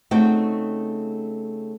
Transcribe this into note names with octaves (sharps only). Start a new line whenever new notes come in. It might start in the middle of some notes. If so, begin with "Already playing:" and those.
C#3 A3 C4 D#4 F#4 G5